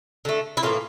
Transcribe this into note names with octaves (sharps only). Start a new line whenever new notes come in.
D3 A3
E4
A2 E3 A#3 F4